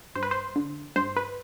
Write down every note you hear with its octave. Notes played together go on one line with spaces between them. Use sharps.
G2 C5
B4
C5
D3
G2 C5
B4